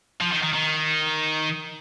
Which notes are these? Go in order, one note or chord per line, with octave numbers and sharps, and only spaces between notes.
F3
D#3
D#3
D#3